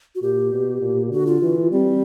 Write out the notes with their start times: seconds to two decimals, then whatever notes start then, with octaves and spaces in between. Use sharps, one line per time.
0.15 F#4
0.22 A#2 G4
0.52 B2
0.81 A#2
1.11 D3 F#4
1.27 F4
1.42 E3
1.71 G3 C4